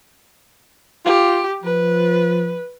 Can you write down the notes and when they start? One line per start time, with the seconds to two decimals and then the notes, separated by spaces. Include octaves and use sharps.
1.05 F4 G4
1.64 F3 B4